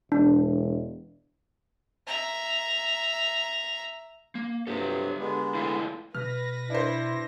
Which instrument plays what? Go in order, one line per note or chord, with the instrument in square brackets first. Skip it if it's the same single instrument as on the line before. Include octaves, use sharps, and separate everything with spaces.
[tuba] E1 [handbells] D4
[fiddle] E5 A#5
[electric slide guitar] A#3
[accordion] G2 C3 F#3 [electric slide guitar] G4 A4
[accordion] D3 G#3 B3
[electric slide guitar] E4 F4 A4
[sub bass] B2 [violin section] B4 A#6 [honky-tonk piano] F6
[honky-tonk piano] D4 C5 [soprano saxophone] E4